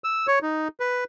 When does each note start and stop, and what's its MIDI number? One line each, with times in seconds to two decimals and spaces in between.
0.04 0.27 88
0.27 0.39 73
0.42 0.68 63
0.80 1.04 71